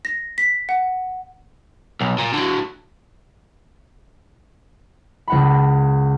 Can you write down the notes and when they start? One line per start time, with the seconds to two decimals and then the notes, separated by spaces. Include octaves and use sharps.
0.05 A#6
0.38 B6
0.69 F#5
2.01 B1
2.18 A#2
2.34 D3 F#3
5.28 C#2 F#5 B5